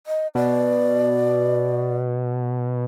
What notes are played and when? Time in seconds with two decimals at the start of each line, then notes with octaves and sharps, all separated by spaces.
0.07 D#5
0.35 B2 D5